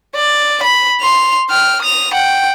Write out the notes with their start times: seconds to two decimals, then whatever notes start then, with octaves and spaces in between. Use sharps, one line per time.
0.15 D5
0.63 B5
1.01 C6 F7
1.50 G5 F6
1.82 D#6 F7
2.14 F#5 G5